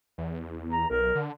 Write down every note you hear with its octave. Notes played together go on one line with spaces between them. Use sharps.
E2
A#5
B1 A#4
D3